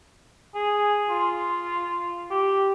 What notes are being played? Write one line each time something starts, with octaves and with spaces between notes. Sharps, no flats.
G#4
F4
G4